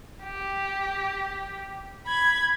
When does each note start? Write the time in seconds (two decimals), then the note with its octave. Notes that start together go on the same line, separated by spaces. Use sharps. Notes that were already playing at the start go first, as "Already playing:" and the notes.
0.23 G4
2.06 B5 G#6